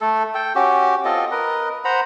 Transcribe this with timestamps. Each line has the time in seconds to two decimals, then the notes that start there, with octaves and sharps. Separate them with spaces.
0.01 A3 A4
0.35 A4 G5
0.55 C#4 F#4 G4
1.05 C4 F4 A4 D#5
1.31 A#4 B4 D#5
1.85 C5 F#5 A#5 B5